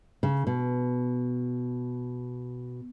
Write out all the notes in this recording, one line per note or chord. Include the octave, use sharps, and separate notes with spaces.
C#3
B2